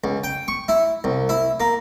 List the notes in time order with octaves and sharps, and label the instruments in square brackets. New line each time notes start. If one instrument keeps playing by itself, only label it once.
[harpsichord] C#2
G5
C#6
E4
C2
E4
A#3